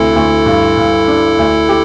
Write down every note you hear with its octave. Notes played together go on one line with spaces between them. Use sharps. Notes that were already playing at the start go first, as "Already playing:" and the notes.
Already playing: D2 C3 E4 A4
D2
G2
G2
D4
D2
G4